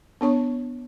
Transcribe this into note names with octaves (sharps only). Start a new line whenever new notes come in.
B3 D4 C#5 C#6